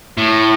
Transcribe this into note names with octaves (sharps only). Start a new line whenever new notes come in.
A2